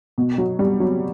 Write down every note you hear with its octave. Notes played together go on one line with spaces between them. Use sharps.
B2
F#3
G3
F#3